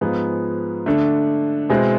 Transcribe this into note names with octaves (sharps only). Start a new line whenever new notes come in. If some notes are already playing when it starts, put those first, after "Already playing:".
G#2 F3 B3 F4 G#4
D3 A3 D4 A4
B2 G#3 C4 E4 G#4